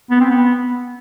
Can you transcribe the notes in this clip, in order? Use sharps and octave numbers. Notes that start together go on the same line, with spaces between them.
B3
C4
B3